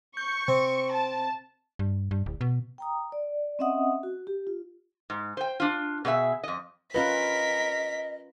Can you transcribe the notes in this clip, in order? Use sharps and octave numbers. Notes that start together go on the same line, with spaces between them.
C#6 G6
C3 C4
A5
G2
G2
D1
B2
G5 A#5 D#6
D5
C4 C#4 D#5 E5 F#5 D#6
F#4
G4
F4
G#2
C5 G5
D4 F4
B2 G#4 C5 E5
F2 D#5
C#4 F4 A#4 B4 D#5 B6